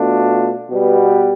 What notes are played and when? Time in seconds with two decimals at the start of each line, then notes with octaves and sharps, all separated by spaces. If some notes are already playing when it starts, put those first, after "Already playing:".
Already playing: B2 A3 D4 F4
0.68 B2 G3 B3